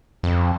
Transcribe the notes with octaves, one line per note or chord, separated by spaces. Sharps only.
F2